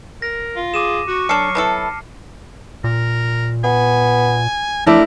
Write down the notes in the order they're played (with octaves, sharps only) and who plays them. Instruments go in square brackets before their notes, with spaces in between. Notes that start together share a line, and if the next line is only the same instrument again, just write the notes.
[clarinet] A#4 [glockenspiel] A#6
[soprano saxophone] F4
[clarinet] G#4 [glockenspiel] D6 D#7 E7
[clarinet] F#4 [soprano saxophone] C#6
[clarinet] F#3 [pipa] D4 A4 [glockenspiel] F6 C7 C#7
[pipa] B3 E4 A4 [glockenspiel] A5
[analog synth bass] A#2 [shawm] A#4
[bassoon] B3 [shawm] G#5
[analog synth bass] F3 [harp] A3 E4 D5 [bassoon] D4 [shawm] A#4